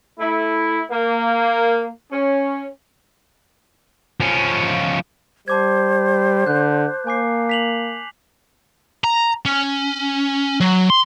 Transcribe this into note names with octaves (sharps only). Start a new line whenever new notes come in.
A3 E4
A#3
C#4
F3 C#4
G3 C5 A5 D6 G#6
D3 F#6 G6
A#3 G#5 D6 C7
B6 F7 F#7
A#5
C#4
F#3
C6